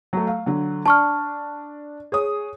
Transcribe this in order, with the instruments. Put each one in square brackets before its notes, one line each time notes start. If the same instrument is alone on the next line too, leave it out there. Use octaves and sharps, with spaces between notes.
[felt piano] F#3 A3
F5
D3 F#3
[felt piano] D4 [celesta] A5 C#6 F6
[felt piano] G#4 C#5 D#6